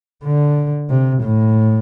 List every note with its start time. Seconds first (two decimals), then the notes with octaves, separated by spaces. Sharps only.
0.24 D3
0.89 C3
1.23 A2